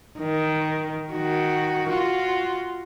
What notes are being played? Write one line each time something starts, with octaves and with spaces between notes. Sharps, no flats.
D#3
D#3 F#4
F4 F#4